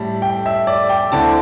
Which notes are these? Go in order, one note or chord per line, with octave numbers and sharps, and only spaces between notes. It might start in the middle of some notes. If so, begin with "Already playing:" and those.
Already playing: A2 G3 E4 A5
G5
E5
D5
G5
D2 D3 C4 E4 A5